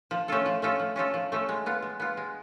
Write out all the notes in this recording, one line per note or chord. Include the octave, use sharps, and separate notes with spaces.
F3
A3 C#4 F4 A4
F3
A3 C#4 F4 A4
F3
A3 C#4 F4 A4
F3
A3 C#4 F4 A4
G#3
B3 F4
G#3
B3 F4
G#3